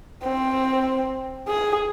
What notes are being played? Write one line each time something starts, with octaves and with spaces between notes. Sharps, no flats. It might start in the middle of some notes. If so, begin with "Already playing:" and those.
C4
G#4